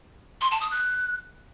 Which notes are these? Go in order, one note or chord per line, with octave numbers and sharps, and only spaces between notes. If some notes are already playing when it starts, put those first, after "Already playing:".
C6
A5
D#6
F#6